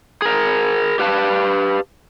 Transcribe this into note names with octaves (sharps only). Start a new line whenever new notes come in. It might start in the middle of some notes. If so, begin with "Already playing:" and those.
G#4 A#4
G4 B4 F5 A5